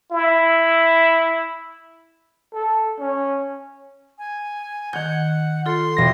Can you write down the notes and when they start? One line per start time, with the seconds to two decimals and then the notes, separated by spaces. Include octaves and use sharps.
0.12 E4
2.54 A4
2.99 C#4
4.18 G#5
4.93 D#3 F#5 G6 G#6
5.66 F4 A4 C6
5.96 E1 A#6